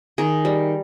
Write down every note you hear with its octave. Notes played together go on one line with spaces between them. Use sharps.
D#3 G#4
G3